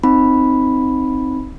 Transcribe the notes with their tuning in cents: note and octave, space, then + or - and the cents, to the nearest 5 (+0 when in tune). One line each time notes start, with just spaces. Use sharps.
C4 +0 D#4 +0 B5 +0